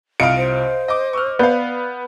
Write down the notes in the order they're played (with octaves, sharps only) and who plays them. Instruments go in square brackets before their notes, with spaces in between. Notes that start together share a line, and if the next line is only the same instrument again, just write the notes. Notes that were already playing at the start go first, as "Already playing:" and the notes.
[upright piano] C2 F4 C#7 [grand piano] D#5 F5 [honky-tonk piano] D7
[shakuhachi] C5
[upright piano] D#5 D6
[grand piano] C#6 E6 F6
[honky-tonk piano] B3 [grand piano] D5 F5 [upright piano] G6